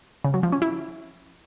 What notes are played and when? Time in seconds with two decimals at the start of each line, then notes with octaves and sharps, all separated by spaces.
0.24 C#3
0.34 F#3
0.43 F3
0.52 C#4
0.62 E4